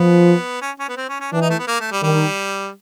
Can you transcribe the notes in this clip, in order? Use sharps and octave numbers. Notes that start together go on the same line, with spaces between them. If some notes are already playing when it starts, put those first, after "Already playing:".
Already playing: F3 B3
C#4
C#4
B3
C4
C#4
C#4
E3 D4
D#4
A3
B3
A#3
A3
G3
D#3 G3